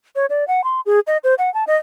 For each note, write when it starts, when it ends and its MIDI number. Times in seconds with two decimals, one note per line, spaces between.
0.16 0.26 73
0.30 0.47 74
0.48 0.64 78
0.64 0.81 84
0.86 1.00 68
1.07 1.18 75
1.24 1.35 72
1.38 1.52 78
1.54 1.64 81
1.67 1.76 75